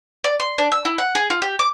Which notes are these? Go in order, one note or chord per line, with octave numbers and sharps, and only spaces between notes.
D5
C6
D4
E6
E4
F#5
G#4
F4
G4
D6